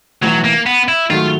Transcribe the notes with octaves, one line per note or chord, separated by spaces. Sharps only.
B1 A2 E3 F#3
A#3
B3
E4
G#2 D#3 F#3 A3 F4